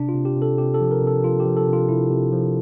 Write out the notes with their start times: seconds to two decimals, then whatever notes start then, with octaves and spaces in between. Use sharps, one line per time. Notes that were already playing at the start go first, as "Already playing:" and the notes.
Already playing: C3 D4
0.09 F4
0.14 C3
0.25 G4
0.36 C3
0.42 A4
0.58 C3 G4
0.74 A4
0.81 F3
0.91 A#4
1.01 C3
1.07 A4
1.24 F3 F4
1.40 G4
1.46 F3
1.57 A4
1.67 C3
1.73 F4
1.89 C3 E4
2.11 C3
2.33 F3